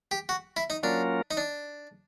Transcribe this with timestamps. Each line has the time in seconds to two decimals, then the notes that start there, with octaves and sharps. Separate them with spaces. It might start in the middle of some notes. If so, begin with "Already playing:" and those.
0.11 G4
0.29 F#4
0.57 E4
0.70 D#4
0.83 F#3 A#3 C#4 D4 F4 A#4
1.31 D#4
1.37 D4